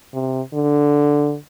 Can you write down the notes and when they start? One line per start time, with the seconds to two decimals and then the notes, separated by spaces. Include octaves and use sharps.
0.14 C3
0.53 D3